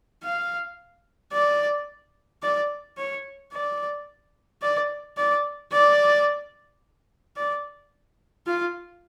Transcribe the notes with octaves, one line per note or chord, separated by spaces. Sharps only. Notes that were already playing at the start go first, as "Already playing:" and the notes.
F5
D5
D5
C#5
D5
D5
D5
D5
D5
F4